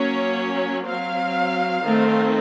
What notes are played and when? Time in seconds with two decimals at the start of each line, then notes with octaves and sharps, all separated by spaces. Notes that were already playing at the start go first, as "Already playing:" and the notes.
Already playing: F#3 A#3 C#4 C#5
0.86 F#3 C4 F5
1.84 D#3 A3 C4